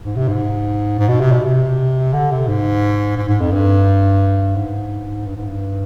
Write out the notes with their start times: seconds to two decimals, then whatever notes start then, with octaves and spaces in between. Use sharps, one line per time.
0.05 G#2
0.16 C3
0.28 G#2
0.99 G#2
1.08 B2
1.20 C3
1.32 B2
1.44 C3
2.13 D3
2.31 C3
2.48 G#2
3.17 G#2
3.29 G#2
3.40 F2
3.52 G2
4.56 G#2
5.26 G2
5.37 G#2
5.47 G2